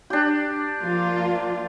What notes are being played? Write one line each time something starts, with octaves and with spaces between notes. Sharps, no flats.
D4 G4
F3 A#3 F4